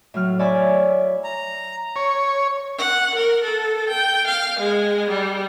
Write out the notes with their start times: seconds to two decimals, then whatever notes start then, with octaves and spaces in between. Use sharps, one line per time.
0.14 A2 F#3 F6
0.39 C#5 D5 E5 G#5 B5
1.24 A#5
1.96 C#5
2.78 F#5
3.15 A#4
3.43 A4
3.89 G5
4.27 F5
4.59 G#3
5.09 G3